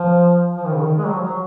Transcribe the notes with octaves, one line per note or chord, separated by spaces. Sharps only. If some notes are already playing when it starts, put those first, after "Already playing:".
Already playing: F3
F3
D#3
C#3
D#3
G#3
F#3
F3
F#3